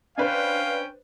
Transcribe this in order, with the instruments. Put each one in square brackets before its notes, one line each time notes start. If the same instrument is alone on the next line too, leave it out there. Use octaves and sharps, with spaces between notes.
[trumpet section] C#4 G5 [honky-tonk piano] D4 B4 C5 [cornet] F5